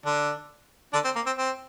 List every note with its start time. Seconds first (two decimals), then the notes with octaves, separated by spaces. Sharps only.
0.06 D3 D4
0.93 D3 D4
1.05 C4
1.16 A#3
1.26 C4
1.37 C4